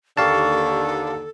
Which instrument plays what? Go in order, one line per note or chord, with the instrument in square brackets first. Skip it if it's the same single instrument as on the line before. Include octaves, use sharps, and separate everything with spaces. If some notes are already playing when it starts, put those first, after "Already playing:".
[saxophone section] D#2 D3 [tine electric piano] G4 F5 A5 [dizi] A4 [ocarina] C#6